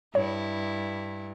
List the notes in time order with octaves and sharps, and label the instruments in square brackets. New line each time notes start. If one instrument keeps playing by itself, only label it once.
[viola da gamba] G2 [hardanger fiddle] E4 [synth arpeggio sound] C#5